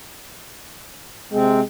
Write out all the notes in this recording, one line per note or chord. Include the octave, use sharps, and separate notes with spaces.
C3 G#3 C4